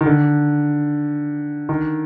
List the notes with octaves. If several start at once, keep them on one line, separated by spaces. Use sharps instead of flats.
D#3
D3
D#3